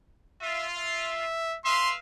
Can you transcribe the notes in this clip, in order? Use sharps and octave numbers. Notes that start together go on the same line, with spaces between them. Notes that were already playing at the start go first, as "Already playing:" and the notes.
F4 E5
E5
B4 E5 F5 C6